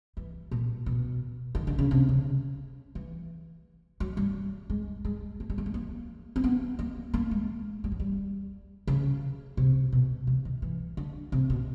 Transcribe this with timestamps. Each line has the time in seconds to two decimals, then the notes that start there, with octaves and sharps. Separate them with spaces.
0.17 E3
0.51 A#2
0.86 B2
1.55 D#3
1.67 D3
1.79 C#3
1.91 C3
2.09 C#3
2.95 E3
4.00 F#3
4.17 G3
4.70 G#3
5.05 G#3
5.40 A3
5.50 G3
5.58 G#3
5.66 A3
5.74 A#3
6.36 C4
6.44 B3
6.79 A#3
7.14 A#3
7.31 G#3
7.84 G3
7.92 F#3
8.00 G3
8.87 C#3
9.57 C3
9.92 B2
10.27 C3
10.45 D#3
10.62 E3
10.97 D3
11.32 C3
11.50 B2